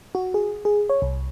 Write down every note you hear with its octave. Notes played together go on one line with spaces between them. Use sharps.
F#4
G#4
G#4
C#5
C2